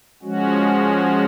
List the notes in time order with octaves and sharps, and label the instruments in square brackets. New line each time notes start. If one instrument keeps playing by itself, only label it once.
[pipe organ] F3 G#3 C#4 F#4